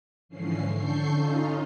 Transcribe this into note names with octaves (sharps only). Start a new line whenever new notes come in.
G#2 D3 E3 F3 C#4 C7
D3 A4 C#6 G6 C7
C#4 D#4 F4